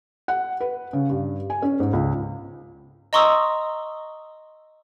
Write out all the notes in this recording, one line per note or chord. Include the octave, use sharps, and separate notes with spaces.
F#5
B4
C#3
G2
G#5
C#4
G#2
C#2
D#5 A#5 C6 C#6 D#6 E6